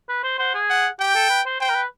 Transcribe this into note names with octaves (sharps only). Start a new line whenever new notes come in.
B4
C5
C5 F#5
G#4
F#5
G4 G5
A4
B4
C5
C5 G5
A#4
B4